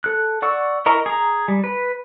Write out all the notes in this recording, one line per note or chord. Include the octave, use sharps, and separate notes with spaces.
A4 F#6
D5 F#5 C#6 E6
E4 A#4 D#5 A#5 C#6
G#4 A#5
G3
B4